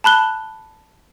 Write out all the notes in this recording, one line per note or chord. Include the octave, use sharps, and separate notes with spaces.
A5 B5 F#6 G7